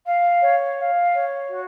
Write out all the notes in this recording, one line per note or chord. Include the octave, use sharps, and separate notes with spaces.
F5
C#5
F5
C#5
F#4